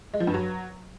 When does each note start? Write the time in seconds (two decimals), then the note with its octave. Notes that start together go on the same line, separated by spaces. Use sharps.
0.14 G#3
0.20 F3
0.27 G2
0.34 F#3